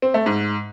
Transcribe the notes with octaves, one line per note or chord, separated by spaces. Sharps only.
C4
A3
G#2